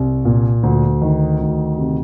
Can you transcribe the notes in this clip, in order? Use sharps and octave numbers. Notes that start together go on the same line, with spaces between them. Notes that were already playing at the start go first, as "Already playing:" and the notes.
Already playing: C2
A#2
D2
D#3
D2
C3